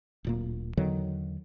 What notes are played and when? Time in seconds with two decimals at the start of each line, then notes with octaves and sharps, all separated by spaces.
0.24 D1 A#2 A#3
0.77 E2 D3 D#3 F#3